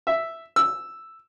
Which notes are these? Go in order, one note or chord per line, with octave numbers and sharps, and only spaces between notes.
E5
E6